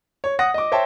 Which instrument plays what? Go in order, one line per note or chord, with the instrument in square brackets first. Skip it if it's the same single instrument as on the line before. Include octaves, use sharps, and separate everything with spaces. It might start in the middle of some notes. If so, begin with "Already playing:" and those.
[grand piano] C#5
F#5 D#6 A#6
D#5 D6
C5 C#5 E5 G5 A5